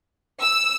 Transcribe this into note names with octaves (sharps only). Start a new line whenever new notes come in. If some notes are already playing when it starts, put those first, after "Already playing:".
E6